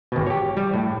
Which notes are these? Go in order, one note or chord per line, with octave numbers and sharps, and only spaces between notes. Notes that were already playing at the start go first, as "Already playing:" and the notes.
G#1 B2
G4 C#5
G3
A2